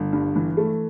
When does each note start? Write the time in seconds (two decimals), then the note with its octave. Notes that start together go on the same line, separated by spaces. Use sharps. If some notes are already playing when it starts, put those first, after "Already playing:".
Already playing: G1
0.13 G2
0.36 E3
0.57 A3